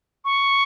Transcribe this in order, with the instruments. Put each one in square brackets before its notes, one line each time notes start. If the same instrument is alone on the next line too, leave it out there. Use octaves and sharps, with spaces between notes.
[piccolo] C#6